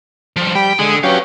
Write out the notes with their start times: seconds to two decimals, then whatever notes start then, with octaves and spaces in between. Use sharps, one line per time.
0.36 F3 G3
0.55 G3 G5 B5
0.79 D3 G#3 D#6
1.03 F#3 C#4 G4 B4 F5